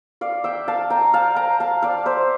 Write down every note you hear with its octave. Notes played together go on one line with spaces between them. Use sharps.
D5 F5
E5 G5
F5 A5
G5 A#5
F5 A5
G5 A#5
F5 A5
D5 F5
C5 E5